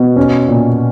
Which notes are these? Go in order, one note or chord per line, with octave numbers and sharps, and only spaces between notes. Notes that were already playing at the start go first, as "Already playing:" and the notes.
Already playing: B2
C#4
A#2